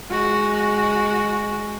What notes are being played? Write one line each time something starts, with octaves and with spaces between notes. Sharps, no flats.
G#3 F#4